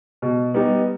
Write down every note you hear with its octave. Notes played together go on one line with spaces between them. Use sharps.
B2
G3 B3 D#4